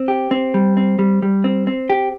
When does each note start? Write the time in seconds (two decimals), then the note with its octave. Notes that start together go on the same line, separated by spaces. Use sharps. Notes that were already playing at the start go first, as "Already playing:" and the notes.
Already playing: C4
0.08 G4
0.31 C4
0.54 G3
0.77 C4
0.99 G3
1.22 G3
1.44 C4
1.67 C4
1.90 G4